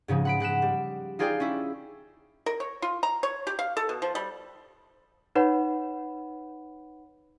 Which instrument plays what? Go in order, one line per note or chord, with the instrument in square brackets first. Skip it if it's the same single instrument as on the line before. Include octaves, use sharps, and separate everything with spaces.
[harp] G#2 C#3 F3 G#3
F#5 B5 D7
G#3 F#5 B6 E7
G3
D#4 F4 G#4 D5 F5 G5
C#4 E4
[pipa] A#4
C#5
F4
A#5
C#5
G4
F5
A4
B2
F3
G3
[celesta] D#4 B4 C#5 F#5 B5